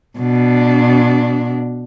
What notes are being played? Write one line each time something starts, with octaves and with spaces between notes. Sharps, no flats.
B2 D4